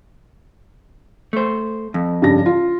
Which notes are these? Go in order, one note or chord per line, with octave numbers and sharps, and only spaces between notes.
A3 C5
F2
G2 C#3 A#6
F4